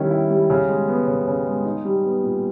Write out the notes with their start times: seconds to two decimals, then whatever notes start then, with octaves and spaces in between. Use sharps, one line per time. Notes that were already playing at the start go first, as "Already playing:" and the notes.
Already playing: D#3 G3 C#4 E4
0.11 E4
0.30 G3
0.50 C#3
0.69 G#3
0.88 B3
1.07 C#3
1.28 C#3
1.47 G#3
1.65 D#4
1.85 G3
2.04 B3
2.24 A#2